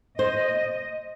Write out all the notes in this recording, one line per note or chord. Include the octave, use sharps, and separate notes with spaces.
C5 D#5